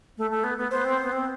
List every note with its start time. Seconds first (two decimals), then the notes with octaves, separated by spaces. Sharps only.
0.18 A3
0.31 A3
0.44 B3
0.58 B3
0.71 B3 C5
0.85 C4
1.03 B3
1.12 C4